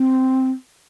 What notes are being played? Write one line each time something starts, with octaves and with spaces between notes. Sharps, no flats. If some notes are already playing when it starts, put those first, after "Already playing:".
Already playing: C4